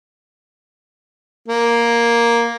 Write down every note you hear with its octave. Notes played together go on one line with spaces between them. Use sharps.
A#3